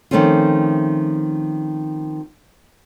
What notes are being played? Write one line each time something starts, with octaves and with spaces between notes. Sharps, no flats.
D#3 F3 A3 C4 C#4 F4